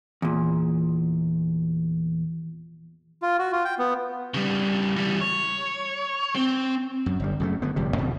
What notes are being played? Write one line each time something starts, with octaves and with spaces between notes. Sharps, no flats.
E2 A#2
F4
F#4
F4
G5
B3
C#3 G3
E3 G3
C#5
C4
F#2
G1 G3
F#2 C#3 A3
D3 B3
D1 F2 C3 G3
E2 B2 D3 E3